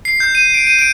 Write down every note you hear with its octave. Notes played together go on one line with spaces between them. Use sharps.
C7
G6
D#7
D7
D#7
D7